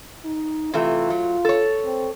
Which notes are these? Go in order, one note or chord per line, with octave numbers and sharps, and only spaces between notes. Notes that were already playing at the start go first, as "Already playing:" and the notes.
D#4
C3 E3 A3 F4
F#3
A4 C#5
C4